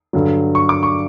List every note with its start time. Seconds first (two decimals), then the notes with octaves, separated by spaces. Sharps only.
0.13 G2 D3 F#3
0.55 C#6
0.69 D6
0.83 C#6